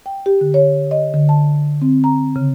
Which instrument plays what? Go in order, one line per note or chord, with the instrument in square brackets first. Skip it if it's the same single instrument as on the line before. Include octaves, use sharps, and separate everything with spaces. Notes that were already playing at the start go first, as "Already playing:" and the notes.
[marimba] G5
G4
D3
C#5
D#5
D3
A5
C4
A#5
C#3